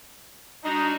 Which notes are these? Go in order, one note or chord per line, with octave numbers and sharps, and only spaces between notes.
G3 D4 D#4 F#4